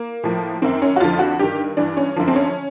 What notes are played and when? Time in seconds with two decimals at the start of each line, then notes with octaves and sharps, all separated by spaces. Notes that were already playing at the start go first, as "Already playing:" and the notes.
Already playing: A#3
0.24 A2 F3
0.62 F#2 D#3 C4
0.82 C#4
0.96 F#4
1.00 F2 D3 F3 F4
1.19 F#4
1.39 G2 D#3 G4
1.77 G2 E3 D4
1.97 C#4
2.16 F#2 D3 F3
2.28 C4
2.36 C#4